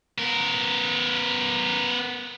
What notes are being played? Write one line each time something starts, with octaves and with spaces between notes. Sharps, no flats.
B3 A#4